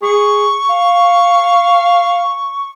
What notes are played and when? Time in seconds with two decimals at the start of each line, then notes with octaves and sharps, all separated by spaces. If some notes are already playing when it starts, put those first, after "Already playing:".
0.02 G#4 C#6
0.70 F5